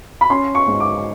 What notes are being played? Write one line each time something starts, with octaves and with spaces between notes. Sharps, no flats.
B5
C#4 C6
C#6
G#2
D6